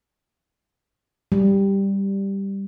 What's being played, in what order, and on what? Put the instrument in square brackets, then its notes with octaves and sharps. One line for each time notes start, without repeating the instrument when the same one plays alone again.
[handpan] G3